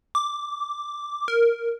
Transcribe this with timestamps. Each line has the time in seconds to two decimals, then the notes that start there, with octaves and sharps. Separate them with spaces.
0.15 D6
1.28 A#4